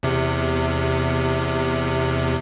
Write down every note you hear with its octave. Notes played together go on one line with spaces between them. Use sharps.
E2 C3